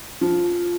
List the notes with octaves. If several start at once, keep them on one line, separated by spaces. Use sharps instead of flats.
F3